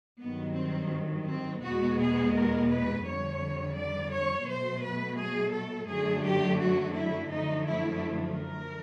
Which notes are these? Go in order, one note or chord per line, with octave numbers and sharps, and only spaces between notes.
G2 D#3 F#3 B3
C4
C4
E2 B2 G#3 B3 F#4
G#4
A#4
B4
F2 D3 G3 C#5
D5
C#5
B2 F#3 A3 C5
B4
G#4
A4
F#2 D3 F#3 A3 G#4
G4
F#4
E4
F#2 D3 F3 A3 D#4
E4
A#4